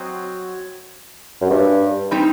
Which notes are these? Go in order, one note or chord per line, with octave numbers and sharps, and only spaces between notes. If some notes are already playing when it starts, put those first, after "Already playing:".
Already playing: F#3 C4 F#4 C5 D#5
F#2
G2
G3 C4 D#4 G4